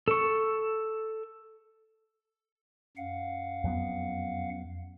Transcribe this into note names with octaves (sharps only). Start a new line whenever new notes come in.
A4 C#6
F#2 F5 F#5
F2 F#3 B3